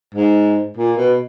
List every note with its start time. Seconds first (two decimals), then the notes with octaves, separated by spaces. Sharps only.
0.15 G#2
0.77 A#2
0.97 B2